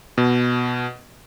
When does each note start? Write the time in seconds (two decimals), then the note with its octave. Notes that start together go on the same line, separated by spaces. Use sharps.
0.18 B2